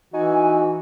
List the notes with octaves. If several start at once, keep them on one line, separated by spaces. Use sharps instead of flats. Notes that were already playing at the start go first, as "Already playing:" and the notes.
E3 D#4 F#4 G#5